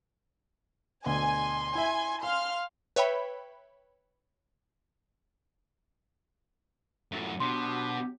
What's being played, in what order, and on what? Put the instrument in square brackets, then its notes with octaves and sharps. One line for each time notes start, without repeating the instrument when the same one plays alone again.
[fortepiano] D2 B2 [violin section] G#5 [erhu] C6
[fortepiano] E4 E5 [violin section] G#5
[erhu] F5 [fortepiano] G#5 [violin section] C6 F6
[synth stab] B4 C#5 E5 G5 B5
[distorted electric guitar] F#2 A2
[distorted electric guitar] B2 [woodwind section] F#3 D4 G4 [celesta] C6